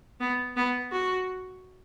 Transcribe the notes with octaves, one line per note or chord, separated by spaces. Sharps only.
B3
B3
F#4